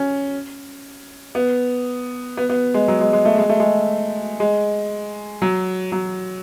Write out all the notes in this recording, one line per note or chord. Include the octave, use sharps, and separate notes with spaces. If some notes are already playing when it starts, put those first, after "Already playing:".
Already playing: C#4
B3
B3
B3
G#3
F#3
G#3
G#3
A3
G#3
A3
G#3
G#3
F#3
F#3